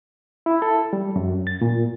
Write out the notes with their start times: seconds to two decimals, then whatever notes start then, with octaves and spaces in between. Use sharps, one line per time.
0.46 E4
0.62 A4
0.93 G3
1.16 F#2
1.47 A6
1.61 A#2